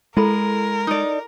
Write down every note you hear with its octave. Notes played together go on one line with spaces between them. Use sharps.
G#3 E4 A4 A#4 B5
D#4 D5